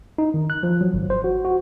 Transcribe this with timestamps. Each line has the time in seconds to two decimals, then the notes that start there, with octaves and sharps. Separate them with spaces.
0.18 D#4
0.34 D#3
0.50 F#6
0.63 F3
0.81 F#3
0.94 G#1
1.10 C5
1.24 F#4
1.45 F#4